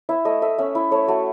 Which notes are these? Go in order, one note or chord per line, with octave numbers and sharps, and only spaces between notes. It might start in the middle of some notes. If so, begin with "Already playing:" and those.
E4 E5
A3 D#5
A3 E5
C#4 E5
E4
A3 C#5
A3 F#4